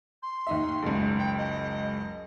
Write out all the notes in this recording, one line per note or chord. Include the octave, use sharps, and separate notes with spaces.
C6
D#2 D#4 E5
F#1 C#2
G5
D#5